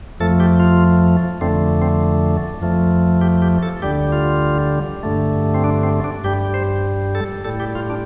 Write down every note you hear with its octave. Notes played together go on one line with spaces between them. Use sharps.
F2 F3 A3 A4
G4
F4
F2 D3 A3 C4
C4
F2 F3 A3
G4
G4
A4
D2 D3 G3 G4
F4
G2 D3 A3
C4
D4
C4
D4
G2 G3 G4
C5
A4
A2 G3 A4
G4
F4
D4